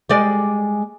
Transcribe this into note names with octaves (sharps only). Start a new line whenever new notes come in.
G3 G#3 D5